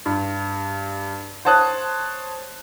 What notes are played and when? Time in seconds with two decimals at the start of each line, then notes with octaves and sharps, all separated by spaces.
0.06 G2
1.45 C5 C#5 A5 D#6 F#6